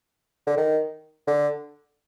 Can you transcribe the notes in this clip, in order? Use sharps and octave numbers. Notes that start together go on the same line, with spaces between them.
D3
D#3
D3